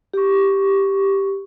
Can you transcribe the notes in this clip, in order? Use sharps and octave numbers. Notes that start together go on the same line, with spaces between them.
G4 C#6